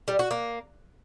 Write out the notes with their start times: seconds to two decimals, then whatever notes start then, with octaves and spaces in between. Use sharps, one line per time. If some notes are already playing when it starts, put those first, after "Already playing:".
0.08 G3
0.19 F#4
0.31 A#3